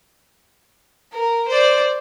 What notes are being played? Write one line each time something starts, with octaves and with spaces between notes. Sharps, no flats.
A#4
C5 D5